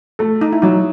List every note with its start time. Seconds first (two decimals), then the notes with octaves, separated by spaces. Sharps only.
0.19 A3 A4
0.41 D#4
0.53 E4
0.62 F#3 D#4